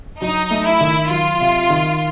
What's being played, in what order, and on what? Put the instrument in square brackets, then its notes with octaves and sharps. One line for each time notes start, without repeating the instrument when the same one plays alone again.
[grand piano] F#3 [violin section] D#4
[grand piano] A3
[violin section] E4
[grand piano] D#3
[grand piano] F#3 [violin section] F4
[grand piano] C3
D#3